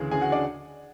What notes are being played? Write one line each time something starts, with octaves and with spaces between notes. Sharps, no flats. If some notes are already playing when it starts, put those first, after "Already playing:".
Already playing: D2 C#3 E3 G#4
D2 C#3 E3 G#4 G#5
F#4 F#5
D4 D5